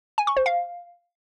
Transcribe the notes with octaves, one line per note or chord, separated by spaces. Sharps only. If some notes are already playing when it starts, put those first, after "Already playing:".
G#5
C#6
C5
F5